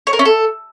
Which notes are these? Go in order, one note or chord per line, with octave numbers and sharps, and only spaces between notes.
C#5
A#4
C#4
A4